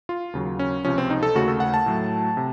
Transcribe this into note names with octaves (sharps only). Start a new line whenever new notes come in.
F4
D#2 C#3 F#3
C#4
C#2 C3 F3 C#4
C4
D#4
A4
D#2 C#3 A3 F#4
A4
F#5
A5
A2 F#3 A3
C3